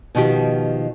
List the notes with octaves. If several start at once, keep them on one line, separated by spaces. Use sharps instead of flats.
B2 D#3 F3 G4